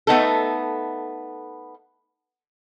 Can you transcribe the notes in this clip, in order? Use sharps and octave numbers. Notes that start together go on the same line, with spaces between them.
A3 B3 D#4 A4